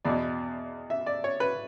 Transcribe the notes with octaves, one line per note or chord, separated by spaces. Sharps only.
E2 B2 D5
E5
D5
C#5
B4